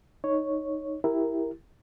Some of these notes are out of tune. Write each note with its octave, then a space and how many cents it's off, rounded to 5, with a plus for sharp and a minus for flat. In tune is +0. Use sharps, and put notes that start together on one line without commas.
D#4 +0 C#5 +0
E4 +0 G4 +0 A#4 +0